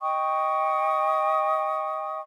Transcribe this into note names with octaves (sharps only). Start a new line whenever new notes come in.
D#5 G5 C#6 D#6